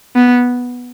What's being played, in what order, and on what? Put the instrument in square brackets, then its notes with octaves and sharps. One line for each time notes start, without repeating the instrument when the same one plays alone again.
[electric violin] B3